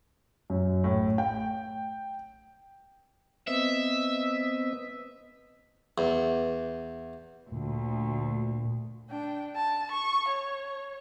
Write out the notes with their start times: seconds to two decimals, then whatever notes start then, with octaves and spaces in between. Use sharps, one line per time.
0.50 F#2
0.84 A2
1.18 G5
3.48 B3 C4 D#5 E5
5.98 E2
7.52 D2 A#2
9.10 D4 G5
9.55 A5
9.92 C#6
10.29 C#5